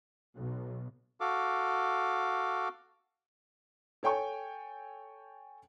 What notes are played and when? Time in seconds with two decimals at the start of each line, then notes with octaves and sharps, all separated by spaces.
0.35 B1
1.20 F#4 A4 F5 D6
4.03 A4 C#5 G5 G#5 C#6